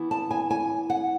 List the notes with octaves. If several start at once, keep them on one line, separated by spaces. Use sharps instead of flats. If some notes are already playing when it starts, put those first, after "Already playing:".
Already playing: E3 B3 E4
A5
G#5
G#5
F#5